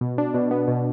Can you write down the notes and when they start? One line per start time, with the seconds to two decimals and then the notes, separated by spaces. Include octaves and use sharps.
0.01 B2
0.18 D4
0.34 B2
0.51 B3
0.68 B2